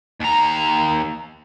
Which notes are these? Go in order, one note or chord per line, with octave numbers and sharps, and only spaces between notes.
D#2 A#5